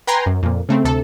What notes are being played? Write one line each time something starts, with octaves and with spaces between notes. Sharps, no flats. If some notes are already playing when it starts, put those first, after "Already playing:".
B4 G5 G#5 A#5 C6
F#2
F2 A#2
C#3 A3 C4
D2 C3 A4